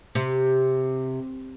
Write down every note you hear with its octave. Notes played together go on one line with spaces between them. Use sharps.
C3